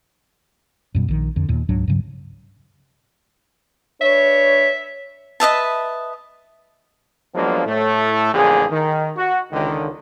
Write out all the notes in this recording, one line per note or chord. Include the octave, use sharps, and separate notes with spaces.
F#2 B2 G3
A#1 D#3
F2 D3
D#2 A#2
C#2 G#2 F#3 D4
G2 C#3 F#3
D4 B4 C#5 E5
B4 D#5 E5 A5
F3 F#3 G#3 A#3 B3 D4
A2 A3
A1 F2 A#2 D3 G#4
D#3
F#4
C#2 D3 D#3